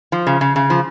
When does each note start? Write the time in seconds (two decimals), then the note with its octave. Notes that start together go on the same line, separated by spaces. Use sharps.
0.12 F3
0.27 C#3
0.41 C#3
0.56 C#3
0.70 F3